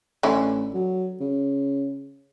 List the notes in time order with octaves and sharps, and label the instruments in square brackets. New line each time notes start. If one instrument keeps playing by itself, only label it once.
[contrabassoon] A1 [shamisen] D3 C#4 E4
[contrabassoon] F#3
C#3